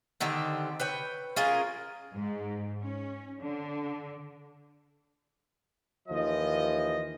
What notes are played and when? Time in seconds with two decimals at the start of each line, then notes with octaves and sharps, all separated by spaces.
0.20 D3 D#3 C4 G4
0.80 B4 C#5 G5
1.36 C#4 F4 G#4 A#4
2.15 G#2
2.83 C#4
3.42 D3
6.09 D#2 E3 F3 D#5